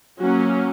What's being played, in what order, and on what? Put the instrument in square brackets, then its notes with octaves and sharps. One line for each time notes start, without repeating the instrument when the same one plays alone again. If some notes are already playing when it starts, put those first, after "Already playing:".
[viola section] F#3 A#3 C#4 F#4